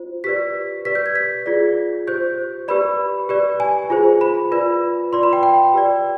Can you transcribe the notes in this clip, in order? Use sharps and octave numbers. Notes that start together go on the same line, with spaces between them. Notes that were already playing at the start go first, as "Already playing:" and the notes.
Already playing: F4 C5
G4 B4 D5 B6
G4 B4 D5 B6
G6
G#6
B6
F4 G#4 D5
G4 C5 G6
G4 B4 D5 B5
G4 B4 D5
G#5
F4 G#4 C5
B5
F4 B4 D5
F4 B4 D5 C6
B5
G5
G5
G4 B4 D5